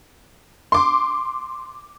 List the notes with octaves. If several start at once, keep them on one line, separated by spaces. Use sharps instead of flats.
C6 D6